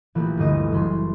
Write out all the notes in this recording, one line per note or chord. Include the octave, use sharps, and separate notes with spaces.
A#1 E3 A3 G4 B4 E7
G1 D2 D#5
F#1 E3 C#4 A4 C6